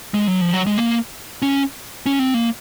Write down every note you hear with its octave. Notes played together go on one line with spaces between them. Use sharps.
G#3
F#3
F3
F#3
G#3
A#3
C#4
C#4
C4
A#3